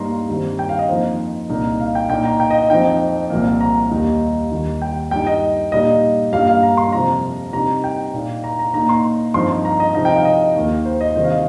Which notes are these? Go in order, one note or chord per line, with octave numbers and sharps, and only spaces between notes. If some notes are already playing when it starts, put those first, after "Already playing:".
Already playing: G2 G3 A#3 D#4 A#5 C6
G2 D#3 G3 C4
G5
F5
D#5
F2 F3 A#3 D#4 C5
C2 A#2 A#3 D#4
F5
G5
A#2 A#3 D#4 G5
A#5
G5
D#5
F2 F3 C4 D#4 G5
C2 A#2 F3 A#3
A#5
D#2 D#3 G3 A#3 D#4
D#2 D#3 G3 A#3 D#4
G5
G2 G3 D#4 G5
D#5
A#2 G3 D#4 D#5
G2 G3 A#3 F5
F5
A#5
C6
F2 C3 F3 A#5
C3 G3 D#4 A#5
G5
A#2 A#3 D#4
A#5
A#5
A#2 A#3 D#4 A#5
C6
G2 F3 C4 D#4 C6
A#5
D#5
C3 F3 D#4 D#5
G5
F5
D#5
D#2 D#3 A#3
C5
D#5
C3 D#3 G3 C5
F5
D#5